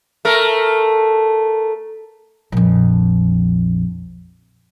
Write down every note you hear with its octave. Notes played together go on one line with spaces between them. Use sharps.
A3 A#4
A#1 F2